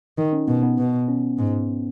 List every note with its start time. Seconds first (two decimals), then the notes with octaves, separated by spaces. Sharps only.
0.18 D#3 D#4
0.33 C#4
0.47 B2 B3
0.63 B3
0.78 B2
1.08 C#4
1.38 G#2